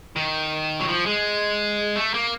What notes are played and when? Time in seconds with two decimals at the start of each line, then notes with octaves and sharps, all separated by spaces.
0.16 D#3
0.80 F#3
0.88 F3
1.06 G#3
1.96 A3
2.14 A#3